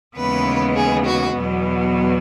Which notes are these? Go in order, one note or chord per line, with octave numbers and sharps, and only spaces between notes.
D#2 C#3 E3 G#3 B3 B4
G#4
F#4
E2 B2 F#3 B3